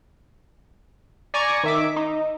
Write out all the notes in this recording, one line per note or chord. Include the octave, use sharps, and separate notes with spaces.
D5 G#5 A#5 C#6
D#3 E5 D6
D#4